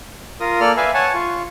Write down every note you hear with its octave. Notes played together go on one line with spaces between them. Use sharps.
F4 A#4 D#6
A#3 A4 D5 F6
B4 E5 F5 G#5
C#5 F#5 G#5 A5
F4 C#6